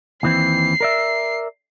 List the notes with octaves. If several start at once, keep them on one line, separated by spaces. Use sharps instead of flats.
D#2 E3 C4 C7
A#4 D5 E5